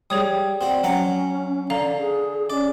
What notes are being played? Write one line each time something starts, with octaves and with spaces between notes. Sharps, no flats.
G3 G#4 C#5 D#6
C4 F#4 D5
F#3 C#4 F#5 A#5
D3 F5 A#5
G#4
C#4 D5